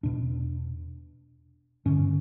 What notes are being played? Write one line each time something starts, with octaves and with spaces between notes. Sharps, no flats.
E2 B2 D4
G2 D3 C#4